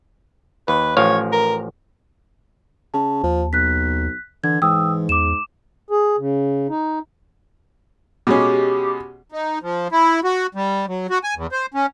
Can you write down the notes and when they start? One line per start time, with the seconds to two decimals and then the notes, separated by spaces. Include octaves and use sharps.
0.68 D#2 B4
0.97 A1 F3 C#5 F5
1.33 A#4
2.94 C#3 A5
3.23 D#2 F3
3.53 B1 F#6 B6
4.44 D3 E3 G#6
4.62 G#2 E3 G5 D#6 E6
5.09 E2 D6 E7
5.91 G#4
6.19 C#3
6.69 D#4
8.27 B2 G#3 C#4 G4
9.32 D#4
9.62 F3
9.92 E4
10.24 F#4
10.55 G3
10.88 F#3
11.10 F#4
11.24 G#5
11.36 E2
11.52 C5
11.74 C#4